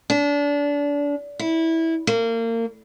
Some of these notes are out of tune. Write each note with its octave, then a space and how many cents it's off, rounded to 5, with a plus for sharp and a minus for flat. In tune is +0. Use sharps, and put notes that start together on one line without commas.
D4 -30
E4 -15
A#3 -30